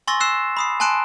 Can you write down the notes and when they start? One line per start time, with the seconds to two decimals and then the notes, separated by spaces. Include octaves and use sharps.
0.08 G#5 C6 C#6 E6 A6 A#6
0.20 E6 F#6 C7 E7
0.57 B5 D#6 C7
0.80 G#5 A5 C6 F#6 D7 E7